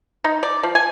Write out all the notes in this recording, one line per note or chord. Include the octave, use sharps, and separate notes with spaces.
D#4
D5
F3
G#5